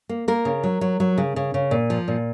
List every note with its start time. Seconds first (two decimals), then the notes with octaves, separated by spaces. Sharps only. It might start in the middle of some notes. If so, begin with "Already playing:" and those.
0.09 A#3
0.28 A#3 A#4
0.45 C#3
0.64 F#3
0.81 F#3
1.00 F#3
1.18 C#3
1.36 C#3
1.54 C#3
1.71 A#2
1.90 F3
2.08 A#2